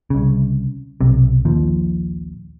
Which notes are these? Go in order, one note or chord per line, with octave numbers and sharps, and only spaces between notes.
C2 C#3
B1 C3
A#1 D#2 F3